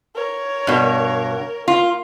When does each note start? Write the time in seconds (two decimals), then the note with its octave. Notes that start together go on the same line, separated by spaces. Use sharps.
0.15 A#4 C#5
0.67 G2 B2
1.68 A#3 F4